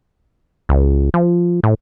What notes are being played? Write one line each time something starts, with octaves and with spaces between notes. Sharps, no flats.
C#2
F3
A2